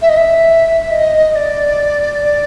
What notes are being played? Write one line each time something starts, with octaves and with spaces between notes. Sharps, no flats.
E5
D#5
E5
D#5
D5
D5